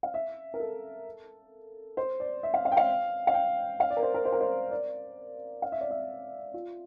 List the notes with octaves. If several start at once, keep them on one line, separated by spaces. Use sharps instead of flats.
F5
E5
A#4
A4
C5
D5
E5
F5
F5
G5
F5
F5
G5
F5
D5
A#4
C5
A#4
C5
A#4
C5
D5
F5
E5
D5
E5
F4